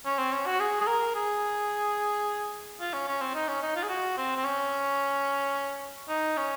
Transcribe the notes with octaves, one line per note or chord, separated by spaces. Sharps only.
C#4
C4
C#4
F#4
G#4
G#4
A#4
G#4
F4
C#4
C#4
C4
D#4
C#4
D#4
F4
G#4
F#4
C4
C4
C#4
D#4
C#4